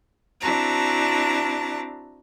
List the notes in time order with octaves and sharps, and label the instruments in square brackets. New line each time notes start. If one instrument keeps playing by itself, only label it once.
[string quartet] C4 D4 E4 F#4 A5 A#5